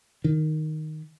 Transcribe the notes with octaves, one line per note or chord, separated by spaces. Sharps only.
D#3